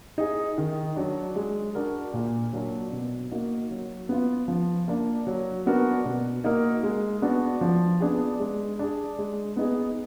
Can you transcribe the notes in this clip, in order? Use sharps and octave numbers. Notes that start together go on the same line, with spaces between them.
D#4 G#4
D#3
F#3 D4
G#3
D4 F#4 A#4
A#2
F#3 A#3 D4
B2
A#3 D#4 F#4
F#3
B3 F4
F3
A#3 D4
F#3
B3 D4 F#4 A#4
B2
A#3 D#4 F#4 A#4
G#3
B3 D4 F#4
F3
B3 D4 G#4
G#3
D4 G#4
G#3
B3 D#4 G#4